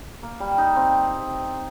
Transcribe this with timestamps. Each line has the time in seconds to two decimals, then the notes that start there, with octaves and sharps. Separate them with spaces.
0.23 A#3
0.40 G3
0.58 D#4
0.76 C4